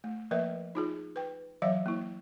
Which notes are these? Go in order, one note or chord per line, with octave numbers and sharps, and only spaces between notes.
A3
F3 A#3 A#4 B4 E5
D#4 F4 G#4
B4 G5
E3 F#3 C#5 E5 F5
A#3 E4